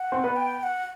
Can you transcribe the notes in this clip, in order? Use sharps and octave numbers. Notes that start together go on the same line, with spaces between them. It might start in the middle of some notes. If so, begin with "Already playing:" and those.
Already playing: F#5
C4 C5
B3 B4
G5
G5
F#5